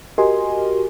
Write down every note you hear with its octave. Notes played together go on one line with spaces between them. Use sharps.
F#4 G4 A#4 D#5 G#5 C6